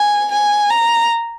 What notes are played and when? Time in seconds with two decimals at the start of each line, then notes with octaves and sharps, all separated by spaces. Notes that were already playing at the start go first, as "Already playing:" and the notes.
Already playing: G#5
0.32 G#5
0.70 A#5